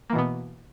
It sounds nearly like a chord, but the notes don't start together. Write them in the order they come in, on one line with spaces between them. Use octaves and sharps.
A#3 E3 B2 B3